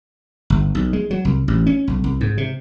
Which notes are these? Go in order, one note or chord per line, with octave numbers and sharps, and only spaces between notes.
G1
B1
G#3
F#3
C2
A1
C#4
B1
C2
G#2
C3